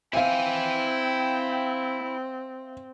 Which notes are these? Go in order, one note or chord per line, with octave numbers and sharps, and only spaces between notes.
C4 E4 E5 F5 G5 G#5